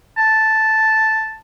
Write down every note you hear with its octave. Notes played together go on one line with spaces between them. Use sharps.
A5